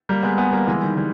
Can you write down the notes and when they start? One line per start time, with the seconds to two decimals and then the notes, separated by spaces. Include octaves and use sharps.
0.09 G3 A#3
0.23 G#3 B3
0.37 G#3 B3
0.52 G3 A#3
0.67 E3 G#3
0.82 D#3 G3
0.96 D#3 G3